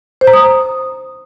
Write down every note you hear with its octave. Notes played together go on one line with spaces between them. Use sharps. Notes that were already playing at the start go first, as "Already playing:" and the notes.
C5
A#5
D#6